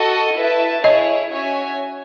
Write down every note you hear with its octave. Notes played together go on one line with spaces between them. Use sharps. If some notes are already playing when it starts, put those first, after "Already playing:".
Already playing: F#4 A4 D#5
E4 B4 E5 A5
E4 G#4 C#5 D#5
C#4 F#4 C#5 E5 G#5